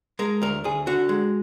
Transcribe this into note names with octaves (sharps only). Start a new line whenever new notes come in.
G#3 A#4
D2 A#4
D2 G#4
D3 F#4
G#3